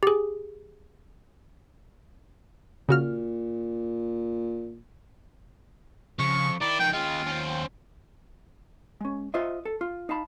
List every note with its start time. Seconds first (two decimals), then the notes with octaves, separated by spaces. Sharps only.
0.03 G4 G#4
2.89 A#2 C#3 F#4 F6
6.19 F2 C#3 C#6
6.61 D#3 E4 D5
6.79 F3 D#4 G5
6.93 D#2 G#3 C#4 F4 G5
7.27 C#4 C5
9.01 G#3 C#4
9.34 F4 C5 D#5 E5
9.65 A4
9.81 F4
10.09 D#4 F5 A5 B5